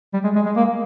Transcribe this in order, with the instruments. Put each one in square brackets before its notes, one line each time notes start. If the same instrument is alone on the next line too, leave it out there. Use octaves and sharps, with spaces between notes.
[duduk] G3
G#3
G#3
G#3
A#3